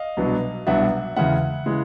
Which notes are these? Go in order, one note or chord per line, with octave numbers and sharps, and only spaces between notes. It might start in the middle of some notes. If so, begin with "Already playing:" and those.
Already playing: D#5 F5
C2 B2 F#3 B3 D4
C2 B2 F#3 B3 D4 E5 F#5
E2 C#3 E3 G#3 E5 F#5
C#3 E3 G#3